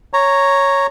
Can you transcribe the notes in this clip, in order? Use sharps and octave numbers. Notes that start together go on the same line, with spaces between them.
C#5 A#5